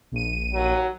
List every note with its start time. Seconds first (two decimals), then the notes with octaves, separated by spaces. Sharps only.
0.12 A#1 D#7
0.54 D#2 F#3